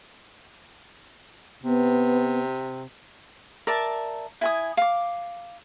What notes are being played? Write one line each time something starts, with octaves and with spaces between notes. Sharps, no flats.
C3 B3
A#4 D5 E5 A5
E4 G#5 D#6
F5 D6